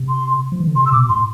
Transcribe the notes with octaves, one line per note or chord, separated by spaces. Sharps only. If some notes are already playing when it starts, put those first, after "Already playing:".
Already playing: C3
C6
F3
E3
D3
C3 C6
E6
B2 D6
A2 C6